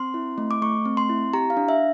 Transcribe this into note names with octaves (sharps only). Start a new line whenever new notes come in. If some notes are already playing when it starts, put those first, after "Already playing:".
Already playing: C4 C6
E4
A3
D6
A3 C#6
C4
C6
E4
G4 A#5
F5
D4
E5